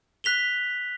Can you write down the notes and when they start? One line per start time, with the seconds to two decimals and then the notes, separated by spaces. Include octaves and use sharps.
0.24 F#6 B6 F7 G7